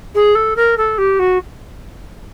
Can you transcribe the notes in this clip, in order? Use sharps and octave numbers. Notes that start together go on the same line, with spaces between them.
G#4
A4
A#4
A4
G4
F#4